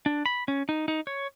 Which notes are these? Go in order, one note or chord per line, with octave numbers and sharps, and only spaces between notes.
D4
B5
C#4
D#4
D#4
C#5